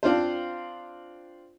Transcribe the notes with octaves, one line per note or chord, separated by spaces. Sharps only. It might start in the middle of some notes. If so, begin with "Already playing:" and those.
C4 D4 F4 C5